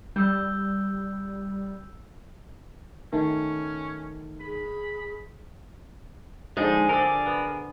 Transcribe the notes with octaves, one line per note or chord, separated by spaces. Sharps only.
G3 E6 G6
D#3 A3 C#4
G#4 B5
D3 F3 G#3 D#4 G#4
D3 C4 A#4 D5
B3